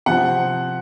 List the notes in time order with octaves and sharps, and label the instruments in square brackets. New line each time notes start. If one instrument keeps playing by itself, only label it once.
[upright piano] C3 F3 C4 F#5